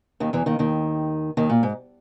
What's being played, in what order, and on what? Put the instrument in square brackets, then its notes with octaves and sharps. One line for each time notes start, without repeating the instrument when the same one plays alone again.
[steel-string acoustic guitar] D#2 D#3
E2 E3
D#2 D#3
D#2 D#3
D#2 D#3
A#2
G#2